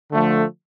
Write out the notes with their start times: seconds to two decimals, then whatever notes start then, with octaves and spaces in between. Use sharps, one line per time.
0.10 D3 F3 A3